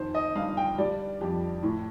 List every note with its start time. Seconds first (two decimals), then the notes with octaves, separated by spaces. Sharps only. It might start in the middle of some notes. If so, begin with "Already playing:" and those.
Already playing: F2 D#3 C5
0.15 D#5
0.35 G2 F5
0.57 G5
0.78 G3 D5
1.21 F2 G4
1.63 A2